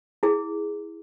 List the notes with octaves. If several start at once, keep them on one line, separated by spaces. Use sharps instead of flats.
E4 G#4